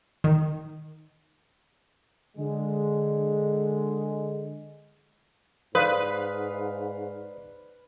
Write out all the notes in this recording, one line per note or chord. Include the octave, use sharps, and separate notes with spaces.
D#3
D3 G#3
G#2 B4 C5 D5 F5 D#6 F#6 B6